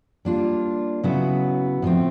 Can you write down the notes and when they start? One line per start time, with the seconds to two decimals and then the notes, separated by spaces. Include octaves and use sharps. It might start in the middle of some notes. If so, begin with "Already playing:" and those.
0.25 G3 A#3 D4 F4
1.03 C#3 F#3 B3 E4
1.82 A2 F3 A3 C4